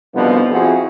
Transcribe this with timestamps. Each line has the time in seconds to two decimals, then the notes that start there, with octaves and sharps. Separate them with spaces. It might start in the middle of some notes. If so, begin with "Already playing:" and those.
0.14 C2 B2 D3 F3 B3 D#4
0.51 F2 C4 E4 F#4 G#4